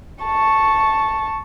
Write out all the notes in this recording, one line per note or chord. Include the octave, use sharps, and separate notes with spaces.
A5 C#6